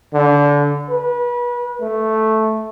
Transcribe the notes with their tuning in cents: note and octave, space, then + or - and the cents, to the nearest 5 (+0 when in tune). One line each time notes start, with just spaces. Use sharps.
D3 -25
B4 -30
A3 -5